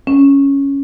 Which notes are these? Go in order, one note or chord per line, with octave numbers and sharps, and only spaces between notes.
C#4